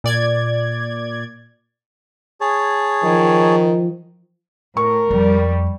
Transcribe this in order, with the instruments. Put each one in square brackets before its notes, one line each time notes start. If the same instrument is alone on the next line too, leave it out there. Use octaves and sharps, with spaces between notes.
[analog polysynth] A#2 D5 G#6
[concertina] G#4 C#5 A5
[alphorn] D#3 [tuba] F3
[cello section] A2 [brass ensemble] A#4 [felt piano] C#6
[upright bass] F2 [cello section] G3